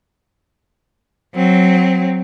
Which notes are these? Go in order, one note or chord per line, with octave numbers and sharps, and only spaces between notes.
F#3 C4